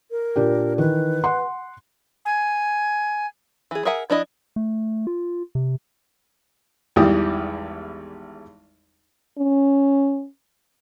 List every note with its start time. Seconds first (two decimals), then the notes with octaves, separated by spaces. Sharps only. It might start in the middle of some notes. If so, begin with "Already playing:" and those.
0.11 A#4
0.36 A#2 D4 G4
0.78 D#3 E3 B4
1.24 F#5 C6
2.25 G#5
3.71 E3 G#4
3.85 G#4 A#4 E5 F#5 G#5
4.10 F3 D4 E4 D#5
4.56 A3
5.07 F4
5.55 C3
6.96 G#1 E2 E3 G3 G4 D#6
9.38 C#4